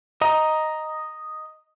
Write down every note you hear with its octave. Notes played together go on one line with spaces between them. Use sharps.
D#5 A#5